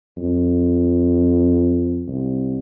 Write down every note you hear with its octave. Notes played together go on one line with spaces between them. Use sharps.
F2
C2